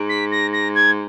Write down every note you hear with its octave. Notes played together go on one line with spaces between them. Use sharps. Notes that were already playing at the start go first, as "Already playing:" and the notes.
Already playing: G#2
B6
A#6
A#6
G#6